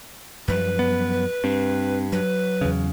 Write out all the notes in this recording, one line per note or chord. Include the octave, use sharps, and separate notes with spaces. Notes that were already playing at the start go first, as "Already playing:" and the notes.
F#2 F3 G3 B4
B3
G2 C4
F#3 B4
E2 C#3